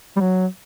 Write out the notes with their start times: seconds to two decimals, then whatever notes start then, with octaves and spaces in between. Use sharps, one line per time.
0.16 G3
0.20 F#3